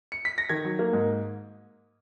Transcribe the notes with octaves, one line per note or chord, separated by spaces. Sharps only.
C#7
B6
A#6
D#3 G#6
F#3
A#3
G#2